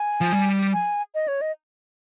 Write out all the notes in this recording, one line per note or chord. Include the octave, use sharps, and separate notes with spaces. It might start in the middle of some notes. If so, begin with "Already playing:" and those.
Already playing: G#5
F3
G3
G#5
D#5
C#5
D#5